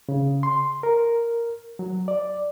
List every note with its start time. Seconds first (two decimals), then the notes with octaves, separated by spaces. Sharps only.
0.09 C#3
0.43 C6
0.83 A#4
1.79 F#3
2.08 D5